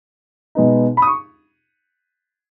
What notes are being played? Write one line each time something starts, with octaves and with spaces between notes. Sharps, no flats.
B2 G#3 B3 D#4
B5
D#6
C#6